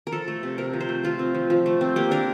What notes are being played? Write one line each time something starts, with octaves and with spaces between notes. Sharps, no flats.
A#4
F3 A4
A3
C3
C3 A#4
F3
C5
A3
A3 F4
C4
F3
F3
A3
C4
A#3 G4
D4 A#4